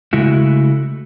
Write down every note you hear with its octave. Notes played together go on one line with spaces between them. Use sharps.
C#3 G#3 A3 E4 F#4